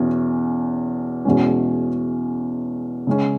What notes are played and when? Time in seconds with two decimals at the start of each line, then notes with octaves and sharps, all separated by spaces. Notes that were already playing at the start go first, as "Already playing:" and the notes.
Already playing: E2 B2 C#4
1.25 E2 B2 G#3 C#4
3.07 C#3 G#3 C#4